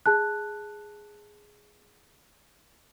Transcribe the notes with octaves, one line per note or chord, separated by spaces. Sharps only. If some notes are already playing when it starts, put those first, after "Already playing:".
G#4 A5 F#6